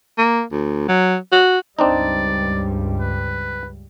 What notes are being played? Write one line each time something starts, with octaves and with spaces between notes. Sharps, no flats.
A#3
D2
F#3
F#4
C#2 G2 G3 C4 D4 D#4 D5
B4